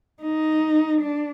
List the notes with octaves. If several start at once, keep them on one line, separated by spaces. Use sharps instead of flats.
D#4
D4